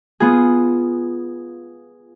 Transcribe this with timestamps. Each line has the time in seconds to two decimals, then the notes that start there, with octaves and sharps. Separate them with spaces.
0.20 B3 F4 G#4